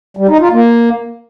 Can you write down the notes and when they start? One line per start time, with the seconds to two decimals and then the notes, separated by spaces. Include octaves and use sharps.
0.17 G3
0.29 D#4
0.40 F4
0.52 A#3